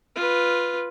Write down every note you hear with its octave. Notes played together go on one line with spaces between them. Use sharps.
F4 B4